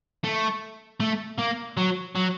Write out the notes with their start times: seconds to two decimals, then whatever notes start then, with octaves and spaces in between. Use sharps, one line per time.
0.24 A3
1.00 A3
1.38 A#3
1.77 F#3
2.16 F#3